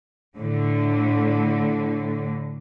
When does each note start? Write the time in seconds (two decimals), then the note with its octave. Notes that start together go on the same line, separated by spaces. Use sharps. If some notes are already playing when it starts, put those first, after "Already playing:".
0.37 A2 D3